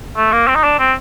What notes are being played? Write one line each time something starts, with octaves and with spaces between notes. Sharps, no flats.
A3
A#3
C4
D#4
D4
C4